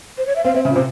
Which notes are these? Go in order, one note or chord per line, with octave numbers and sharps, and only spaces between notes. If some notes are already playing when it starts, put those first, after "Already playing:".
C5
C#5
E5
C4 F5
C4 E5
C#3 E5
A#2
C3 C5